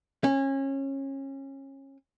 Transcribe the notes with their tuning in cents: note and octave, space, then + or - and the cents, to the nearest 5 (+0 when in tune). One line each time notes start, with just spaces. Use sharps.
C#4 -25